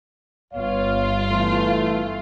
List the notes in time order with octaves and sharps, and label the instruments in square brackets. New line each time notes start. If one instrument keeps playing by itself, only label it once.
[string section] G1 F4 [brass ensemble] B3 C#5 F5
[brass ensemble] E3 A3